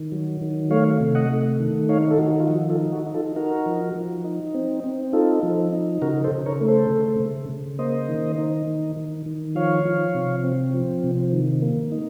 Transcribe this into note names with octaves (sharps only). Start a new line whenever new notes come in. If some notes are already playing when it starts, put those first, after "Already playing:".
Already playing: D#3
F#3
D#3
A3 C#5 F5
C3
D#5 F#5
A3
D#3
D#4 C#5 F5
A4
D#3 F#4
F4
F3 F#4
F4 A4
D#4
F#4
D#4
F4 A4
D#4 F#4 A#4
F3
F3
D#4
C4
C4
D#4 F4 A4
F3
D#4
C#3 F#4 A#4
A4 C5
C#3
A#4 C#5
A3
A4 C5
C#3
C#3
C#3
A#3 C5 D#5
D#3
D#4
D#3
D#3
D#3
F3 C#5 F5
F3
C3
C4
F3
C3
D#3
A#3
D#4